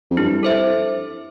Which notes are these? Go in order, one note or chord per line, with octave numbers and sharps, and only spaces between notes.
F2
G2 E4
A4 C5 E5